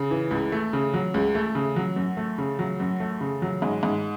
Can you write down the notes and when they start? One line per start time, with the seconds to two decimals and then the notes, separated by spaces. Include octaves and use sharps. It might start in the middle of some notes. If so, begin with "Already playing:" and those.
Already playing: C#3
0.11 E3
0.31 C#2
0.52 A3
0.73 C#3
0.94 F#3
1.14 C#2
1.35 A3
1.55 C#3
1.76 F#3
1.96 F#2
2.17 A3
2.38 C#3
2.59 F#3
2.80 F#2
3.00 A3
3.21 C#3
3.42 F#3
3.62 G#2
3.83 G#2